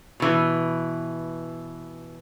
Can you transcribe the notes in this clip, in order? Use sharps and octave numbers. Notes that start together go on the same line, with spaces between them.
B2 E3